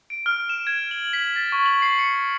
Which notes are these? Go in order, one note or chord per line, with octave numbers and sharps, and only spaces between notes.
D7
F6
E7
G#6
F#7
B6
A6
C#6
F#7
C7
C#7